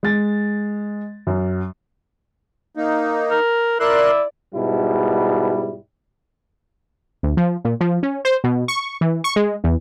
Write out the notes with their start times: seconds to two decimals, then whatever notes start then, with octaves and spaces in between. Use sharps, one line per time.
0.03 G#3 A6
1.27 F#2
2.76 A#3 D#4
3.30 A#4
3.80 E4 A#4 D5 C6 F#6
4.54 G#2 B2 G3 E4
7.23 D2
7.37 F3
7.65 A#2
7.81 F3
8.03 C#4
8.25 C5
8.44 B2
8.68 C#6
9.01 E3
9.24 C#6
9.36 G#3
9.64 E2